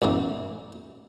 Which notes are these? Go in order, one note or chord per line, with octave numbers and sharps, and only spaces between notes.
B1 F#2 E3 A#3